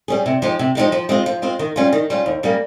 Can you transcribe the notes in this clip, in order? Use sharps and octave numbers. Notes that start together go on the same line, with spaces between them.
G3 C#4 G#4
C3
F3 G#3 D#4 G4
C3
F3 G#3 D#4 G4
F3
G#3 C4 F4 C5
F3
G#3 C4 F4 C5
D#3
G3 C#4 F4
D#3
G3 C#4 F4
D#2
C#3 G3 A#3